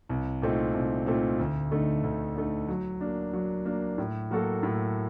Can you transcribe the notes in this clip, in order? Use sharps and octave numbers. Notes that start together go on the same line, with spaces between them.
C2
A#2 A3 C4 D#4
C2
A#2 A3 C4 D#4
D2
D3 A3 D#4
D2
D3 A3 D#4
F#3
A#3 D4
F#3
A#3 D4
A2
F#3 A#3 F#4 A4
A2